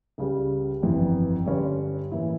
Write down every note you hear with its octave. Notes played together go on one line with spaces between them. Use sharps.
C#2 C#3 G3
G1 F2 E3
G2 D3 G3 C#4
A2 E3 A#3 E4